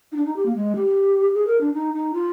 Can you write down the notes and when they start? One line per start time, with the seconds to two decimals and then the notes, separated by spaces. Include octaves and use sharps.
0.12 D#4
0.16 D4
0.26 D#4
0.36 G4
0.45 A#3
0.55 G#3
0.75 G4
1.34 G#4
1.47 A#4
1.60 D4
1.74 D#4
1.93 D#4
2.13 F4